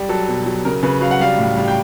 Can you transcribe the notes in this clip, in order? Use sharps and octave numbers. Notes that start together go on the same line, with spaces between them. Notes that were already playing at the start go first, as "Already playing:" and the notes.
Already playing: G3
F#3 A4
B2
F#3
C#3 A#4
C#3 B4
F#3 F5
F#5
G3 F5
A2
G3
G5